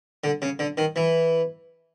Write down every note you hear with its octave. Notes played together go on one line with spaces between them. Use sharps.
D3
C#3
D3
D#3
E3